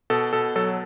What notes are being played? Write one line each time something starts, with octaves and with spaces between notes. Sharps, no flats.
B2 A4
B2 A4
F#3 A4